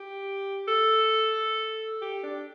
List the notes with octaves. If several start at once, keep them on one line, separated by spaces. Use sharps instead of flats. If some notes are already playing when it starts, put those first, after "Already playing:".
Already playing: G4
A4
G4
D4